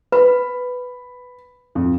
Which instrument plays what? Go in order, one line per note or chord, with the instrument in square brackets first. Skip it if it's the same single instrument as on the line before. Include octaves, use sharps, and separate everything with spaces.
[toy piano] B4 [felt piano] B5
[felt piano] F2